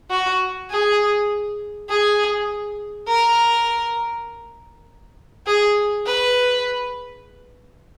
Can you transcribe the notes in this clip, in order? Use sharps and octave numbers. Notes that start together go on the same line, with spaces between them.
F#4
G#4
G#4
A#4
G#4
B4